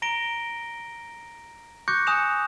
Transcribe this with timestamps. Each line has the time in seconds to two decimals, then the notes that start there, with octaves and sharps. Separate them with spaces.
0.02 A#5 A#6 D7 G7
1.88 C#6 D6 F#6 G6 A#6 C#7
2.07 G#5 D#6 F#6 C#7 E7 F7